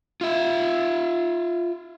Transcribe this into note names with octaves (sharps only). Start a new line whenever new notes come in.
F4 E5